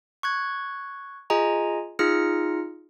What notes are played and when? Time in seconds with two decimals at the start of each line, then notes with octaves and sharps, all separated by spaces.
0.23 C#6 F#6 G#6
1.30 F4 G#4 D#5 G#5 A#5
1.99 D#4 F4 G#4 F6 A#6 C#7